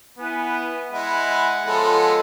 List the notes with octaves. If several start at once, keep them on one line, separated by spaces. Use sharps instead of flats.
B3 E4 B4 G#5
G#3 E4 D#5 F#5 B5
F3 G#3 B3 A4 C#5 D#5